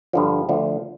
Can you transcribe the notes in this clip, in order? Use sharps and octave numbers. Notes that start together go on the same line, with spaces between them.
G2 D3 F3
D2 D3 F3